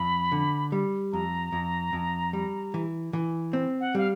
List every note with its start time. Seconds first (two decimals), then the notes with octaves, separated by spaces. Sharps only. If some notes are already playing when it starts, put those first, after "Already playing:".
Already playing: F2 B5
0.32 D3
0.72 G3
1.13 F2 A#5
1.52 F2
1.93 F2
2.33 G3
2.74 E3
3.13 E3
3.53 C4
3.80 F#5
3.95 G3 F5